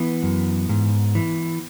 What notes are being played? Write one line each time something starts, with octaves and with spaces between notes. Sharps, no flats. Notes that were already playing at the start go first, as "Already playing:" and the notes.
Already playing: E3 B3
F#2
G#2
E3